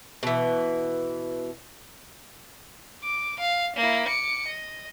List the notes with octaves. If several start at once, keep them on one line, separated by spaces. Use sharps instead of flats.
B2 E3
D6
F5
A#3 E4
D6 C#7
D#5